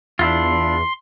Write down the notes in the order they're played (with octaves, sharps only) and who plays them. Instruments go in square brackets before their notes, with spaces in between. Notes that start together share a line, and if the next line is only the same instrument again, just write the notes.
[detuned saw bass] E2 [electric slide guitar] D4 E4 F4 [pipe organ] C6